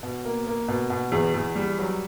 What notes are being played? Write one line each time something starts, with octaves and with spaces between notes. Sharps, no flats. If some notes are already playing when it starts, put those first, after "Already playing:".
B2
A#3
A#3
B2
B2
E2
E2
G3
F#3